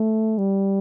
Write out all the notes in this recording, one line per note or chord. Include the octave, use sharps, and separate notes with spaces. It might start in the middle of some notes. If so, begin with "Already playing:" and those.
Already playing: A3
G3